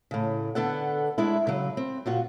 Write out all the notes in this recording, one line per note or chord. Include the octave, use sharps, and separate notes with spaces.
A2 C#3
D3 B3 A4 F#5
G#3 D4 E4
C#3 F#3
C4
A#2 F4 F#4